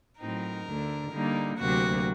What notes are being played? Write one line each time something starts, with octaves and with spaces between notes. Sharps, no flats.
A2 F#3 C4 D#4 A#4
D2 D3 A3
D3 G3 A#3 D#4
D2 C3 F#3 A#3 F#4